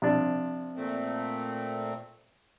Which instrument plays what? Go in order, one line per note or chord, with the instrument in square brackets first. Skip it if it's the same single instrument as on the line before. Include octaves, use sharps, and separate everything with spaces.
[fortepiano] C3 F3 D4
[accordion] A#2 A3 C4